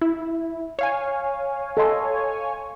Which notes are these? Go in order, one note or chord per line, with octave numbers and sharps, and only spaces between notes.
E4
C#5 F5 G#5
A4 D#5 C6